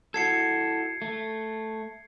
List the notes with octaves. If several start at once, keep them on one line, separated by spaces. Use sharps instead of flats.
E4 F#4 A4 G#6 C7 C#7
A3